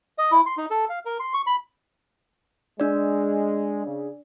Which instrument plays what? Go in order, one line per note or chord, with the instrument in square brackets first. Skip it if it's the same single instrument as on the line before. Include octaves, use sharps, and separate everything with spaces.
[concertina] D#5
E4
C6
D#4
A4
F5
A#4
C6
C#6
B5
[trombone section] G#3 [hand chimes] D4 D5
[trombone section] C#3